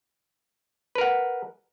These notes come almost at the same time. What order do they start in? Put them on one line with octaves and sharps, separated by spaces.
B4 A#4 F#5